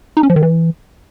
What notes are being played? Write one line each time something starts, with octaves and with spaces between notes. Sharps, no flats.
D#4
C#4
F3
D#3
E3